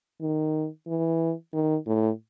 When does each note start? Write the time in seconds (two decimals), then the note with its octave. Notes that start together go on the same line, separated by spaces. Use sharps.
0.21 D#3
0.87 E3
1.53 D#3
1.87 A2